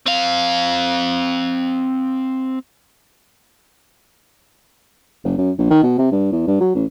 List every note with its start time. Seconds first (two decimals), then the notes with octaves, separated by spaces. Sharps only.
0.07 C4 F5
5.24 F#1
5.37 F#2
5.58 A#1
5.70 D#3
5.83 B2
5.98 C3
6.11 G2
6.32 E2
6.47 G2
6.60 F#3
6.75 A1